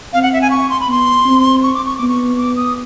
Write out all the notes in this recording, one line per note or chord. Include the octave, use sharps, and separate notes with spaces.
C4 F5
F#5
E5
G#5
C#6
C6
B5
B3 C6
C4
C#6
D6
C#6
B3 D6
C#6
D6
D#6